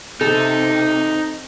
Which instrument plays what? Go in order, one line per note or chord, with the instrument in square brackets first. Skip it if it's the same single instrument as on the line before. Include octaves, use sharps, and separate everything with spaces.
[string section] C3 [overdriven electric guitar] D#4 [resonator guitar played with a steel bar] A4